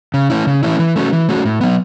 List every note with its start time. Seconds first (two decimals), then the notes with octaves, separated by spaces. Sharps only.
0.14 C#3
0.30 E3 A3 C#4 E4
0.47 C#3
0.63 E3 A3 C#4 E4
0.79 E3
0.96 A3 C#4 F#4
1.13 E3
1.29 A3 C#4 F#4
1.45 A2
1.61 F#3 B3